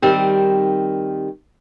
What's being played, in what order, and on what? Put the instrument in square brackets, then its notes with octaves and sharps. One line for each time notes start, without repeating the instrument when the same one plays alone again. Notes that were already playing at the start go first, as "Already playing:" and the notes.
[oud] D#3 G3 C4